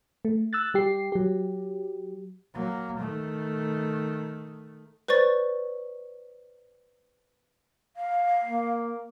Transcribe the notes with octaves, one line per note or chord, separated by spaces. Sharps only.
A3
E6 F#6 A6
G3 G4 C7
F#3 G4
F#3 A#3
D#3 A3
B4 C5 D5 C#6 A6
F5
A#3